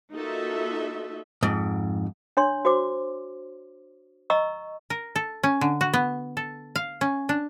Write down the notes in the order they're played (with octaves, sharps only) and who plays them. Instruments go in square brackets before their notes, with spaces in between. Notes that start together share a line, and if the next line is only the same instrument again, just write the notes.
[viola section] A#3 D#4 F4 F#4 A4 E5
[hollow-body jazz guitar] F2 G#2
[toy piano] D4 C#5 C6
F#4 C5 D6
D#5 A#5 C#6 E6
[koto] A#4
A4
C#4
D3
F#4
B3
A4
F5
C#4
D4